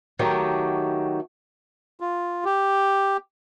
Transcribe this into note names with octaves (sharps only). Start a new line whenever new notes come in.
D#3 F#3 A3 G4
F4
G4